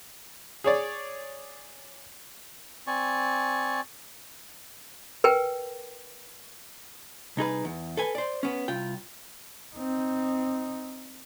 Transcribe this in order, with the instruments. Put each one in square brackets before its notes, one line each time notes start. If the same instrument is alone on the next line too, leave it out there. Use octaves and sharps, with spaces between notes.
[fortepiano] G#4 C#5 D5
[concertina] C4 D5 G#5 C#6
[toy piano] A#4 B4 G5 G#5
[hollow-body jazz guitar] C2 D#4 G#4 B4
E2
A4 B4 G#5
C5 D5
B3 C#4
C2 F4 G5
[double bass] C4 D#4